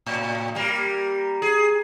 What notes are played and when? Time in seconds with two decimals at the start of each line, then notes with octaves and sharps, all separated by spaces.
0.06 A2
0.55 G3 A#3
1.42 G#4